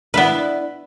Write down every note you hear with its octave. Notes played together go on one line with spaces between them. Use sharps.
B3 D4 E4 B4